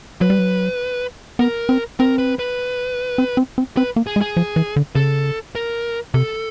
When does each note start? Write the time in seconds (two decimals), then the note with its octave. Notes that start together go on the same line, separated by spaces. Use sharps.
0.21 F#3 B4
0.30 G3
0.39 F#3
1.39 B3 A#4
1.69 C4
2.00 C4 A#4
2.18 B4
2.39 B4
3.18 C4
3.37 C4
3.58 C4
3.77 C4 B4
3.96 A#3
4.07 G#4
4.16 G#3
4.21 G#4
4.37 F3
4.56 E3
4.76 D3
4.95 C#3 A4
5.55 A#4
6.14 C3 A4